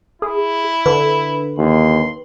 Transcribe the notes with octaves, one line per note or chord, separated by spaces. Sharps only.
E4 G#4
D3 B4
D#2 C6